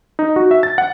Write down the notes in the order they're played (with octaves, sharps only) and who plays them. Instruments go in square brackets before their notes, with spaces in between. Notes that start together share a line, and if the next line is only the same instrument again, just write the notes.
[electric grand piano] D#4
F#4
E5
A6
F#5